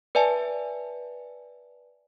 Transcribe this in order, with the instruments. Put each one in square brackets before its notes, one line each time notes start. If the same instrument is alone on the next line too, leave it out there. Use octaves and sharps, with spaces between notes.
[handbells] B4 D5 E5 G#5 A5